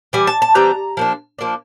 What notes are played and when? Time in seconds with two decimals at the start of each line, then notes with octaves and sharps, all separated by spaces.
0.13 E3 G3 G#5
0.27 A5
0.42 A5
0.55 E3 G3 C4 A#5
0.97 F3 A#3 D4
1.39 F3 A#3 D4